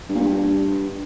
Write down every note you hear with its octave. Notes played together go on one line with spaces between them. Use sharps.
G2
A#2
G2